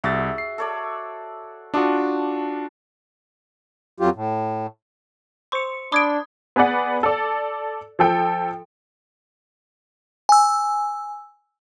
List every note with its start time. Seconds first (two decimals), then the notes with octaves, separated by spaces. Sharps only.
0.04 C2 F#4 G#4 E5 A6
0.38 C7
0.58 A4 C#5 D5
1.74 D4 F4 F#4 A5 D6 D#6
4.00 F2 F#3 F4 G4
4.15 A2
5.52 C5 C6 C#6 C#7
5.92 D4 B5 D6 D#6 G#6 D7
6.56 B3 G#4 B4 D5 F#5
7.03 A4 D5
7.99 F3 A4 G5
10.29 G#5 E6